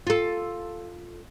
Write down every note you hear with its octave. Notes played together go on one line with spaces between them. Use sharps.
F4 A4